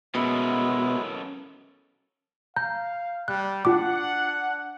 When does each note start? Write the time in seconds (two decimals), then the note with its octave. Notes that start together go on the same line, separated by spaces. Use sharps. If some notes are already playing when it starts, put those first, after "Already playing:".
0.15 B2 G#3 C#4 E4 A4 A#4
2.56 F5 A#5 G6
3.28 G3 F#6
3.65 D4 F4 F#5 D6